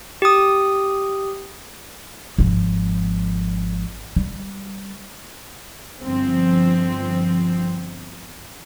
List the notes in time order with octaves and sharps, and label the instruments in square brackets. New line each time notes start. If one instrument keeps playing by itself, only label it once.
[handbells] G4 D#6
[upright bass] G#1 F3
G3
[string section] G1 F3 C4